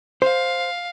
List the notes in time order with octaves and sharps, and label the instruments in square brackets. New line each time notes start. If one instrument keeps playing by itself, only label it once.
[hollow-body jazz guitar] C5 [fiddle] F5